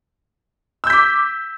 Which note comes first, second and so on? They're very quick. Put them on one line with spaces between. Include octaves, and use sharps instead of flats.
E6 G6 B6 D6